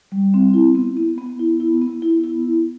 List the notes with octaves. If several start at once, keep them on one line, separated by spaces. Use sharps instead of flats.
G3
C4
E4
B3
B3
B3
E4
E4
B3
E4
E4